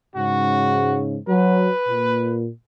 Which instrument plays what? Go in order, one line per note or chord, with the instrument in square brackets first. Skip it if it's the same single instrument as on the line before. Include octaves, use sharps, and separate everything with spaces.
[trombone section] G#2 C#3 [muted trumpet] F#4
[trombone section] F#3 [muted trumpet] B4
[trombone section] A#2